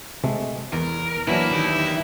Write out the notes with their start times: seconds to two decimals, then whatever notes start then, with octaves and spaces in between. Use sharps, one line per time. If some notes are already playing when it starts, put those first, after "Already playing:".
0.24 C3 G#3 A3
0.73 E2 A#4
1.28 E3 F#3 A#3 D4 E4
1.52 D#3 G4